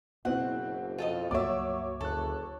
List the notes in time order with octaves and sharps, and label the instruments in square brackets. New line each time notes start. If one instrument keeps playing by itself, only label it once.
[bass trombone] F#1 [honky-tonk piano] B2 C4 E4 [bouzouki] F#5
[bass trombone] F2 [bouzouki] F4 A4 D#5
[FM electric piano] C#2 G2 A#3 [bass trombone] F#3 [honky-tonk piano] C#5 D6 [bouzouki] D5 E5
[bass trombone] F#1 [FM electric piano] D2 F#6 [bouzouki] A4